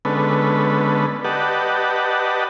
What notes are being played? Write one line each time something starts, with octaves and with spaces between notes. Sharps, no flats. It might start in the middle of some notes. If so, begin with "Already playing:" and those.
D3 G#3 B3 C#4 A4 B4
G4 B4 D5 D#5 F#5 A5